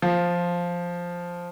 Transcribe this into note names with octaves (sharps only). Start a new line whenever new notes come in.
F3